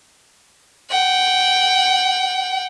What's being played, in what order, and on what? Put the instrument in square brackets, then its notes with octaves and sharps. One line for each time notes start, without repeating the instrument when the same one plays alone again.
[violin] F#5 G5